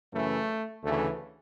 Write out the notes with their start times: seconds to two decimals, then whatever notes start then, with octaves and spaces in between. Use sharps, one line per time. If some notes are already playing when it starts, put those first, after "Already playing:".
0.13 F#2 C#3 E3 A3
0.84 D2 C#3 E3 A3